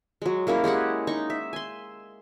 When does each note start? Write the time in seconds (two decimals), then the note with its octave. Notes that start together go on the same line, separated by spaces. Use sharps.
0.22 F#3 G#3
0.47 G#3 A#3 C#4 E4
0.64 G#3 G4 G#4 F#5
1.07 D#4 C#6
1.30 E5
1.53 G#5 C6